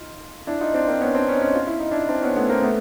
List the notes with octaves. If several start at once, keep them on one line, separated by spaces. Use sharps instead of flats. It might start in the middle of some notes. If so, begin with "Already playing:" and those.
Already playing: D#4 F4
D4 E4
D#4 F4
C4 D4
A#3 C4
B3 C#4
C4 D4
C#4 D#4
C#4 D#4
F4
E4
D#4
D4 E4
C4 D4
B3 C#4
A3 B3
A#3 C4
A3 B3